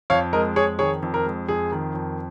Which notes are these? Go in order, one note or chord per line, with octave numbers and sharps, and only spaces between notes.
F2 C#5 F5
G#3 A#4 D#5
F2 G#4 C#5
D#3 G#4 C#5
F2
A#4
G#3
F2 G#4
D#3
F2